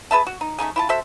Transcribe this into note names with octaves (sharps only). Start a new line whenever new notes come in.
G#4 B4 E5 A5
F#4
D#4
A3 C#4 D#4 G#4
E4 F4 A5
F#4 A4 C5 E5